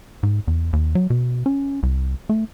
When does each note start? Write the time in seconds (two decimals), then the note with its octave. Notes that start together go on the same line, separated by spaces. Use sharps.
0.23 G#2
0.48 E2
0.73 D#2
0.95 F#3
1.10 B2
1.46 C#4
1.83 C2
2.30 A3